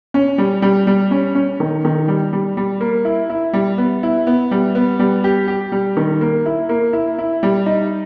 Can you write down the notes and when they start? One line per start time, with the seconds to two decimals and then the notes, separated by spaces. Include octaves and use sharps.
0.14 C#4
0.38 G3
0.62 G3
0.87 G3
1.11 C#4
1.35 C#4
1.60 D#3
1.85 D#3
2.08 G3
2.33 G3
2.57 G3
2.81 A#3
3.05 E4
3.30 E4
3.53 G3
3.78 B3
4.03 E4
4.27 B3
4.51 G3
4.75 B3
4.99 G3
5.24 G4
5.48 G4
5.72 G3
5.97 D#3
6.21 A#3
6.46 E4
6.69 A#3
6.93 E4
7.18 E4
7.43 G3
7.66 D#4